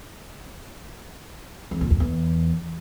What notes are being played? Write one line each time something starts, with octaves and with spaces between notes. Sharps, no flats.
F2
A#2
F2
E2